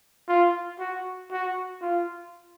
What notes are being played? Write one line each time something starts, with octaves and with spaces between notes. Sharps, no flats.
F4
F#4
F#4
F4